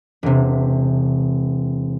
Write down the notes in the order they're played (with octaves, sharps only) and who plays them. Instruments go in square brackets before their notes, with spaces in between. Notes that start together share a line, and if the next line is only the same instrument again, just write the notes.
[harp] E1 C3